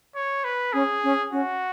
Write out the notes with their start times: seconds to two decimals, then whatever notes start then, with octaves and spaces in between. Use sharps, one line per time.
0.15 C#5
0.44 B4
0.73 C#4 G#4
1.03 C#4
1.32 C#4 F#4